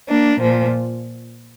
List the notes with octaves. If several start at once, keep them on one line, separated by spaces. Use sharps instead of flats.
A#3 D4
A#2 F3